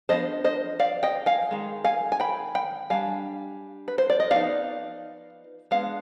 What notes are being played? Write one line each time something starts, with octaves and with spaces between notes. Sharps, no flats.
F3 B3 D4 C5 D#5
C5 D#5
D5 F5
D#5 G5
F5 G#5
D#3 G#3
F5 G#5
G#5
G5 B5
G5 B5
G3 D4 F5 G#5
B4
C5
D5
D#5
F3 B3 D#4 D5 F5
G#3 B3 D4 F5